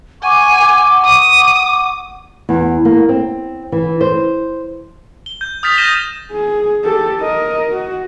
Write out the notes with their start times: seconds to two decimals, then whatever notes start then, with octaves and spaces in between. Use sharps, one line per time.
0.23 F#5 G#5 C#6 D6
1.04 D#6
2.49 E2
2.85 A#3
3.09 C4
3.72 E3
4.01 C5
5.26 G7
5.41 G6
5.63 D#6 F6 G6 A6 B6 F7
5.77 G6 A6 A#6 D#7 E7 G7
6.31 G#4
6.84 G4 A4
7.20 A#4 D#5
7.71 F#4